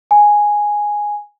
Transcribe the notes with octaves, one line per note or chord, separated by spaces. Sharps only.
G#5